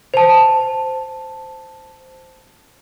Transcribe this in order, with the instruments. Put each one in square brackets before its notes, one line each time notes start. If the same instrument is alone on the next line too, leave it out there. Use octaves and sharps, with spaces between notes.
[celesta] C5 A5